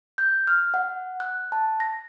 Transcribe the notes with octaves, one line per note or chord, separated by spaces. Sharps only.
G6
F6
F#5
F#6
A5
A#6